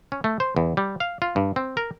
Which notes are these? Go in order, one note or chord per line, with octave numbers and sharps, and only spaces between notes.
C#4
A3
C5
E2
G3
F5
F4
G2
C4
A#4